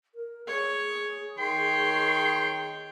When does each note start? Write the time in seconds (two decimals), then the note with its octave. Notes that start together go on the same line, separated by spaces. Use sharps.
0.15 A#4
0.47 G#4 C#5
1.38 D#3 C#5 G5 C6